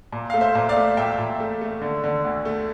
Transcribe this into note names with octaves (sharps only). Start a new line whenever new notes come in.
A#2
A3 F5
C5 E5
A#2
D5 F5
A3
A#2 E5 G5
A#2
A3
A3
D3
D3
D2
A3